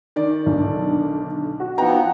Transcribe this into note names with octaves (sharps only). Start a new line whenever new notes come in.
D#3 D5
B1 D3
F#4
F3 B3 C4 D#4 F#4 B4 G5 A#5